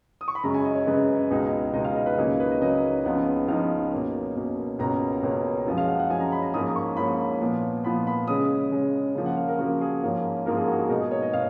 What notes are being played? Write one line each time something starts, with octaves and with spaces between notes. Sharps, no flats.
D#6
C#6
B5
F#2 C#3 G#3 A#5
G#5
D#5
C#5
F#2 C#3 G#3 B4
C#2 B2 G#3 D#4
C#2 B2 G#3 D#4 D#5
F5
D#5
B4
C#2 C#3 F#3 A#3 D#4 G#4
G#4
B4
D#5
C#2 C#3 F#3 A#3 D#4 D#5
C#2 C#3 F3 B3 D#4
C#2 C#3 F3 B3 D#4 F5
B2 A#3 C#4
B2 A#3 C#4
C#2 B2 A#3 C#4 A#5
C#2 B2 A#3 C#4
F#2 F3 G#3 C#4
F5
F#5
F#5
F#2 F3 G#3 C#4 G#5
A#5
B5
A#5
G#2 F3 A#3 C#4 D#6
C#6
G#2 F3 A#3 C#4 B5
A#2 F3 B3
A#2 F3 B3 B5
B5
C#3 G#3 C#4 D#6
C#3 G#3 C#4
C#3 F3 A#3
F#5
F5
A#4
C#3 F3 A#3 F#4
G#4
G#2 F3 A#3 C#4
G#2 F3 A#3 C#4 A#4
G#4
F#4
G#4
B2 G#3 D#4 A#4
G#4
C#5
D#5
B2 F5